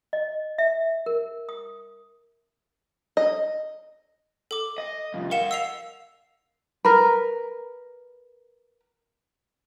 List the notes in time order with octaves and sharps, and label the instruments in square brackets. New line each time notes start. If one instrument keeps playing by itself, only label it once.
[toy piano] D#5
E5
A#4
D#6
[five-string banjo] D#5
[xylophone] A4 D6
[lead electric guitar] D#5
C2 F2
[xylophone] A#4 F#5 E7 [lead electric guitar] D#5 F5
[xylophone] E6 C7 F7
[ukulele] A#4 B4